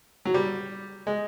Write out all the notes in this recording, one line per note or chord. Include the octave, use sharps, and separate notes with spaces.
F#3
G3
G#3